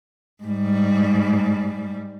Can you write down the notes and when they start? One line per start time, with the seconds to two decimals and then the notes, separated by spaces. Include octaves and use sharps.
0.44 G#2 G3